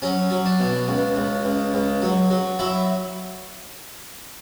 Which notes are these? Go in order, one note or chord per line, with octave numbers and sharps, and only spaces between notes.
F#3 C#4
F#3
D4
B2
C#2
C#2
C#2
C#2
F#3
F#3
F#3 E4